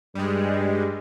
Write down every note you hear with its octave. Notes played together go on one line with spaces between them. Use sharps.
G2 G3 G#3